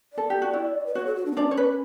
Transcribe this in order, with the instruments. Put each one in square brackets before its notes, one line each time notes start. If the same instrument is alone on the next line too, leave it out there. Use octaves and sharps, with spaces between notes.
[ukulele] A4 [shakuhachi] D5
[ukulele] G4
F#4
E4
[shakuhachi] B4
[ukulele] F#4 [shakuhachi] C#5
[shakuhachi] A4
F#4
D4
B3
[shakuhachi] C#4 [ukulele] D4 D5
[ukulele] C#5
B4